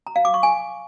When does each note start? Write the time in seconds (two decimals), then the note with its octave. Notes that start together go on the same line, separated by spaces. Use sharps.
0.07 A#5
0.16 F5
0.25 D6
0.34 C#6
0.43 G#5